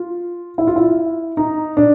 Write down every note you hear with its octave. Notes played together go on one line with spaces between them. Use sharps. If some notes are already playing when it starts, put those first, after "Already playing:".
Already playing: F4
E4
F4
E4
D#4
D4